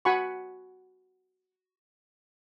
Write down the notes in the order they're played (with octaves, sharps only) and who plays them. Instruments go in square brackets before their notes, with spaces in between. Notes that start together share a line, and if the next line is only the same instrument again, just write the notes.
[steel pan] F#4 F#5 G#5 B5 C#6